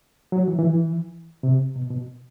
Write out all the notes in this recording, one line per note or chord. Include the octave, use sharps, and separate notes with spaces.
F#3
E3
E3
E3
C3
B2
B2